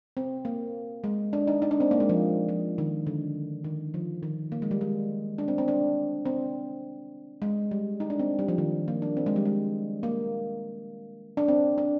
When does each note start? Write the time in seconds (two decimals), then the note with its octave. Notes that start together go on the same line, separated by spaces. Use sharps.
0.17 C4
0.45 A#3
1.04 G#3
1.33 D4
1.47 D#4
1.62 D#4
1.71 D4
1.80 C4
1.91 A#3
2.00 G#3
2.09 F3
2.49 F3
2.78 D#3
3.07 D3
3.64 D#3
3.94 F3
4.23 D#3
4.52 A#3
4.62 G#3
4.71 G3
4.81 G#3
5.38 D4
5.48 C4
5.58 C4
5.68 D4
6.25 C4
7.42 G#3
7.71 G3
8.00 D#4
8.10 D4
8.19 C4
8.39 G3
8.48 F3
8.58 D#3
8.88 A#3
9.02 D4
9.17 C4
9.26 G#3
9.36 G3
9.45 G#3
10.03 A#3
11.37 D4
11.48 C4
11.78 D4